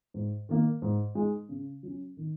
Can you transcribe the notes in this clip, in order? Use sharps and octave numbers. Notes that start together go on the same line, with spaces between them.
G#2
D#3 A#3
G#2
G#3 D#4
C#3
F#3 C#4
D#3